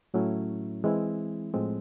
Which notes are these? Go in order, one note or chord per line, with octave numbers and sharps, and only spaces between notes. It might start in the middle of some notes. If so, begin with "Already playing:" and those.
A2 F#3 A3 C#4 E4
E3 G#3 C4 E4
A2 F3 G#3 C4